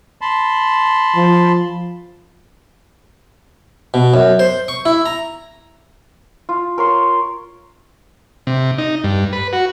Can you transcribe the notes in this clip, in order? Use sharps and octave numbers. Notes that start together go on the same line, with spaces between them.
A5 B5 C6
F3
B2
F#2
C5
C#6
E4
A#5
F4
A#4 C#5 C6
C3
D#4
G2
B4
F#4